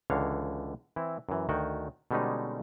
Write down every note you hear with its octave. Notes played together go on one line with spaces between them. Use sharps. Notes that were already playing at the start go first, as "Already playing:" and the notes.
C#2 D3 E3 C#5 F5
E3 C4 E4
F#2 E3
D2 D#3 F#4 G5
B2 D3 G3 G#3 C#4 D#4